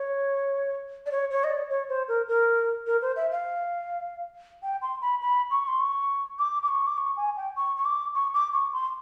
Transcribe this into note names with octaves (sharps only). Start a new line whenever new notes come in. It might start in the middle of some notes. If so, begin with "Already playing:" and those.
Already playing: C#5
D5
C#5
C#5
D#5
D5
C#5
C5
A#4
A#4
A#4
C5
E5
F5
G5
C6
B5
B5
C#6
C6
C#6
D6
D6
C#6
D6
C#6
G#5
G5
C#6
C#6
D6
C#6
D6
C#6
C6